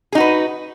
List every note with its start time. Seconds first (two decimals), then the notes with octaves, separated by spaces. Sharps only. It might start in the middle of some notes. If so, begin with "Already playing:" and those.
0.12 G#4
0.15 D#4
0.18 F#4
0.20 B4